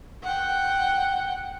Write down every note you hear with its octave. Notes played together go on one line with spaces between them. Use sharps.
F#5 G5